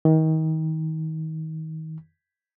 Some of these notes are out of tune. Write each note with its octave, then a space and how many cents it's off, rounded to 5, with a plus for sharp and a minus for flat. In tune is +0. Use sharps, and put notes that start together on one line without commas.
D#3 +30